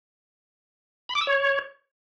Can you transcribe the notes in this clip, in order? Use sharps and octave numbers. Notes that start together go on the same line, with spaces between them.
B5
D6
E6
C#5